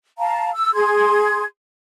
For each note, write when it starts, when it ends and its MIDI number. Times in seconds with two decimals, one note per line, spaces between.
0.18 0.50 77
0.18 0.50 81
0.18 0.50 82
0.54 0.73 88
0.74 1.44 68
0.74 1.44 84
0.74 1.44 92